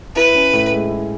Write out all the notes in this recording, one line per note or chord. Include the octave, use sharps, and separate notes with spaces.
E4 B4
C#4
A2
G#3
E4